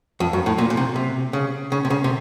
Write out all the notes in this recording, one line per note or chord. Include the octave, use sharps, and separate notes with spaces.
F2
F#2
A2
A#2
A#2
C3
C3
C#3
C#3
C3
C#3
C3